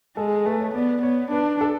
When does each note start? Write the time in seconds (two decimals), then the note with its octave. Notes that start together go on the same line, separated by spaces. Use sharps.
0.17 G#3 A4
0.46 A3 B4
0.60 C#5
0.74 B3 D5
1.02 B3 C#5
1.31 D4 B4
1.61 A4